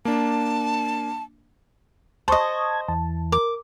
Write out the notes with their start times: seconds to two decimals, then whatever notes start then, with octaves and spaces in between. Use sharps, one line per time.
0.05 A#3 D4 A5
2.28 D2 C5 D#5 A5 C#6 D#6 F#6
2.40 G#6
2.88 E2 E3 A5
3.32 A#4 D6